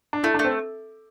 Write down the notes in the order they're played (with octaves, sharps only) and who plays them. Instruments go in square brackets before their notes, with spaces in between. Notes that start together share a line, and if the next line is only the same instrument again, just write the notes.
[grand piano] D4
[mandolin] A3 [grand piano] E4
[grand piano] D4
[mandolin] A3
[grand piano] C4